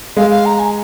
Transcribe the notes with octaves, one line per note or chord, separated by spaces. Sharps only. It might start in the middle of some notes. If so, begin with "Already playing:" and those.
G#3 F5
F5
A#5
G#5